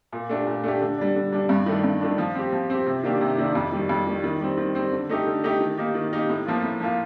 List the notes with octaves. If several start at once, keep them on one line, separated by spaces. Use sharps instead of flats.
A#2
A3 D4 G4
A#2
A3 D4 G4
D3
G3 D4
D3
G3 D4
G2
D#3 A3 D4
G2
D#3 A3 D4
F3
C4 G4
F3
C4 G4
C3
D#3 A#3 D4 G4
C3
D#3 A#3 D4 G4
F2
D#3 G3
F2
D#3 G3
D#3
G3 C4
D#3
G3 C4
D3
A3 D#4 G4
D3
A3 D#4 G4
D#3
A#3 D#4 G4
D#3
A#3 D#4 G4
A2
F3 A#3 F4
A2
F3 A#3 F4